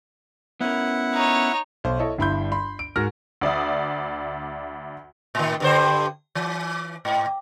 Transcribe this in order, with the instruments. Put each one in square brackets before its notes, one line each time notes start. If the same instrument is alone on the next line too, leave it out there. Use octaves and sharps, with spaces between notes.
[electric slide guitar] B3 C#4 A#4 [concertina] E4 F#5
[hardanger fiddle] D#4 C#5
[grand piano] B1 C5
E4 A4 C#5 D#5
G1 G2 E4 B5 C6 G6
B5 C6
D7
G#2 F#4 A#4 F6 A#6
[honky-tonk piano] D2 D5 E5 D#6
[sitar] A2 D#3
G2 D3 C5
E3
G#2